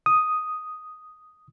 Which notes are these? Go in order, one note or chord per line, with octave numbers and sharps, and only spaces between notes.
D#6